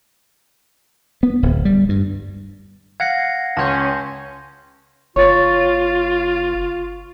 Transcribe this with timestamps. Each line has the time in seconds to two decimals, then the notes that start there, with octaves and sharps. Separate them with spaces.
1.23 B3
1.43 D1
1.65 G3
1.89 G2
3.00 F5 F#5 G#6 A#6 C7 C#7
3.57 C#2 C#4 A5 C6 G6
5.16 F#1 F4 C#5 C#6 A6